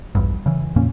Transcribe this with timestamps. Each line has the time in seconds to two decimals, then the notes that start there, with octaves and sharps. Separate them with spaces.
0.15 A#1 E2 G2
0.46 C#3 E3
0.76 F2 A#2 A#3 C#4